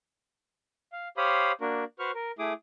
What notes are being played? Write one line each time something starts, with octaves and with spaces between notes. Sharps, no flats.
F5
G4 C5 C#5 F5 B5 D#6
A#3 D4 F#4 A#4
F#4 B4 C5 C#6 F6
A#4
A3 E4 G#4 D6 D#6